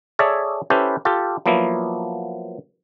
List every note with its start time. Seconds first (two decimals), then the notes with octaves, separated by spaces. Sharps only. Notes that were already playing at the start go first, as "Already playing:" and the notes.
0.19 G#4 A4 C#5 D5 E5
0.70 C#4 E4 G4 A4 B4 C5
1.05 F4 G4 A4
1.46 F3 F#3 A#3 B3 E4